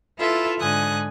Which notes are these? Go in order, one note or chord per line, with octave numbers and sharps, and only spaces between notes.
E4 F4 A4 B4 E5
G#2 D3 G#5 D#6 F#6